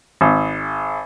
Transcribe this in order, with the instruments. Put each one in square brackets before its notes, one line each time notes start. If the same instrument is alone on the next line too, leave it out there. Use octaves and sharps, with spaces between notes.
[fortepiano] G#1